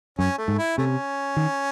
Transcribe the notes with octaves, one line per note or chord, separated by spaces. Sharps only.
F#2 C#4
A3
G#2
E4
C3 A3 C#4
D#3